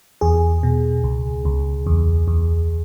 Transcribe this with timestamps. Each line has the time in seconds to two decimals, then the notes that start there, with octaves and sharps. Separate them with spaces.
0.21 E2 G#4
0.63 B2
1.04 C#2
1.45 C#2
1.87 E2
2.28 E2